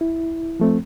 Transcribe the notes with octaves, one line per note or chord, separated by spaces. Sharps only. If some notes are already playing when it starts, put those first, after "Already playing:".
E4
F3 A3 C4